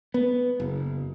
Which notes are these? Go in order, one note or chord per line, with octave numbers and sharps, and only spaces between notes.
B3
F#1